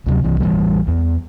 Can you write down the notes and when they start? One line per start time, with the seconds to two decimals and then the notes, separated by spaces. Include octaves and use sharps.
0.06 D2 C3 F#3
0.24 C2 E3
0.40 A1 C3 E3 G3
0.88 E2